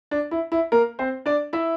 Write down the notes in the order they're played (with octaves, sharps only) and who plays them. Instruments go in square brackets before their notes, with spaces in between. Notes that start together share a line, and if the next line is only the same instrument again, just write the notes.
[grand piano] D4
E4
E4
A#3 A#4
C4 C5
D4 D5
E4 E5